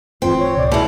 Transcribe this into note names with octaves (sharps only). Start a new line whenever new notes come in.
D1 G2 E3 C4 F4
C#5
C#2 A2 C3 D5
A1 B2 G#3 E4